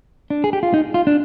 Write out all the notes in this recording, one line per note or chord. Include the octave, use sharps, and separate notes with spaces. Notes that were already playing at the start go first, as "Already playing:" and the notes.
D4
G#4
G4
F4
D#4
F4
D4